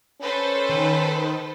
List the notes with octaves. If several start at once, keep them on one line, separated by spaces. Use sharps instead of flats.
C#4 A4 B4 C5
D#3